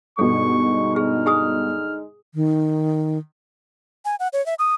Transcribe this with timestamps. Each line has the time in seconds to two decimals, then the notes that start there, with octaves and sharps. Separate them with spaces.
0.19 G2 B2 D3 G#3 D#4 A4 C#6
0.96 G#4 F6
1.26 G#4 G#5 D#6
2.35 D#3
4.05 G#5
4.20 F#5
4.33 C#5
4.46 E5
4.59 D#6